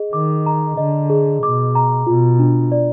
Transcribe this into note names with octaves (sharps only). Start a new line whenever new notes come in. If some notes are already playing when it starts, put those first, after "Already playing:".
Already playing: G#4 D#5
D#3 D6
A#5
D3 D#5
G#4
B2 D6
A#5
B2 F4
D4
D5